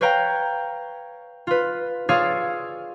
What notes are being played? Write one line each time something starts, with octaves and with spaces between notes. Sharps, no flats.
B4 C#5 F5 G5 A#5
F4 B4
F4 G#4 C#5 D5 F5 E6